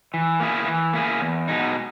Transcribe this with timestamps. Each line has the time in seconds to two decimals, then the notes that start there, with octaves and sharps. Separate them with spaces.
0.14 E3
0.40 A#3 E4 G#4
0.67 E3
0.93 A#3 E4 G#4
1.21 E2
1.48 B2 G#3 D#4